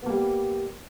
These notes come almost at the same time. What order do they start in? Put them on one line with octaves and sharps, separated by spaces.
B3 A#3 G3